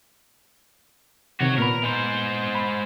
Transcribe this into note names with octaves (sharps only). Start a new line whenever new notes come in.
C3 D#3 F#4 C#5
A#2 B3 A#4 B5
G#3 C5
B5